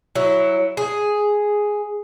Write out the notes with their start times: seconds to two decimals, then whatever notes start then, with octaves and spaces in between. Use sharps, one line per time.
0.15 F#3 E4
0.77 G#4